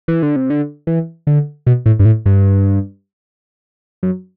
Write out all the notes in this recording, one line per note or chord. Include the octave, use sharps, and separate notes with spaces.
E3
D3
C3
D3
E3
D3
B2
A2
G2
A2
G2
F#2